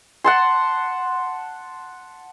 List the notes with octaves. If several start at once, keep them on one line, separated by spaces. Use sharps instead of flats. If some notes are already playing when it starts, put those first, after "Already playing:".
F#5 A5 C6